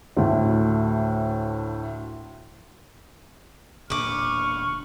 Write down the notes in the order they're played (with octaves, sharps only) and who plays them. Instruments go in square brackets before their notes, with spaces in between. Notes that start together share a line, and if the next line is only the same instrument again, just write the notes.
[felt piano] D2 A2
[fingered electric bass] E1 A#2 D3 [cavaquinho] B4 D6 [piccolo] C#6 [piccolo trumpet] F6